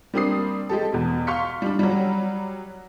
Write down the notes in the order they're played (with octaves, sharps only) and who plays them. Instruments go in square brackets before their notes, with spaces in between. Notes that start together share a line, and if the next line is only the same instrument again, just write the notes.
[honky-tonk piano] G3 A#3 C4 D4 D#6 C7
G#3 G4 A4
E2 B2
F5 C6 C#6 F6 B6 C#7
G3 D4
F#3 G3